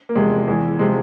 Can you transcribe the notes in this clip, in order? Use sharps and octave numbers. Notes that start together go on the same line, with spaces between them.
A#3
E2 C3 F3 G#3
E2 E3
C3 F3 G#3